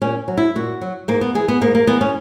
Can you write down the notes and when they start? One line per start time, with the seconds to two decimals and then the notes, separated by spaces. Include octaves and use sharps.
0.02 A#2 C#4
0.28 F#3
0.37 E4
0.55 A#2 F#4
0.81 F#3
1.08 G#2 A#3
1.21 B3
1.35 E3 G#4
1.48 B3
1.61 G#2 A#3
1.75 A#3
1.87 E3 B3
2.01 C#4